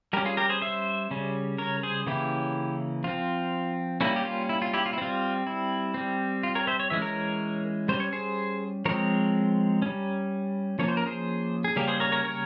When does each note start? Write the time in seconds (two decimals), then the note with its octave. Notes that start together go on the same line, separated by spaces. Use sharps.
0.13 G3 C#4 G4 A#4
0.25 F4 G#4
0.37 G4 A#4
0.50 G#4 C5
0.62 C5 E5
1.11 C#3 G3 C#4
1.58 A#4 C#5
1.83 G#4 C5
2.07 C#3 E3 A#3 C#4 E4 G4
3.04 F3 C4 F4
4.01 G3 A#3 C#4 E4
4.16 G4
4.25 F4
4.49 E4
4.62 F4
4.74 E4 G4
4.86 F4
4.93 E4
4.98 G3 C4 F4
5.47 E4
5.94 G3 C4
6.43 F4
6.55 A#4 C#5
6.67 C5 E5
6.80 C#5
6.90 E3 G#3 C#4 E5
7.02 A#4 C#5
7.88 G3 C#4 C5
8.00 C#5
8.13 G#4 C5
8.85 F3 G#3 C4 A#4 C#5
9.82 G3 C#4
10.79 F3 A#3 C#4 C#5
10.88 C5
10.97 A#4
11.06 G#4 C5
11.64 G#4
11.76 C#3 G3 A#3 C#4 G4 A#4
11.88 G#4 C5
12.00 A#4 C#5
12.12 A#4 C#5
12.24 A#4 C#5